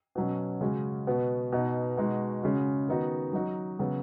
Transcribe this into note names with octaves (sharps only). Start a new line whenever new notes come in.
B2 F#3 C#4
C#3 G#3 C#4 F#4
B2 B3 F#4
B2 B3 D#4
B2 G#3 D#4 F#4
C#3 G#3 C#4 F#4
D#3 B3 D#4 F#4
F#3 D#4 F#4
C#3 F#3 B3 F#4